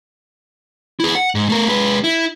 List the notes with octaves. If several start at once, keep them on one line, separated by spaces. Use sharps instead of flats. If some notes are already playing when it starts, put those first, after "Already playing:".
E4 G#4
F#5
G#2
A3 A#4
G#3 B4
E4